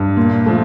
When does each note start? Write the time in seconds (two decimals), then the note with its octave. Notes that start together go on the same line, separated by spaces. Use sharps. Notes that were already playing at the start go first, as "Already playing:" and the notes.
Already playing: G2
0.17 A#2
0.46 F3 A3